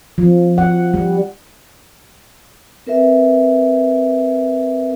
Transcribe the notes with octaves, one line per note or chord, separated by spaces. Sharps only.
F3
F#5
G3
C4 A#4 B4 E5